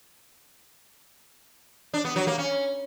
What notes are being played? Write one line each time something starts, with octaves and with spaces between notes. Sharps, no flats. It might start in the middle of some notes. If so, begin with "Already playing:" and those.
D4
B3
F#3
A#3
C#4